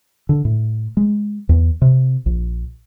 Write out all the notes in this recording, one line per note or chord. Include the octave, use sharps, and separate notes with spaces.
D3
A2
G#3
E2
C3
A#1